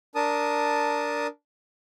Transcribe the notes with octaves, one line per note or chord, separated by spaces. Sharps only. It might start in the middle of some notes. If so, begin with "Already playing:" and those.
D4 A#4 A5 D#6